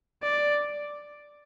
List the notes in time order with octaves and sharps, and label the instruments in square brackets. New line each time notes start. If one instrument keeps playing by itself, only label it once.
[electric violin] D5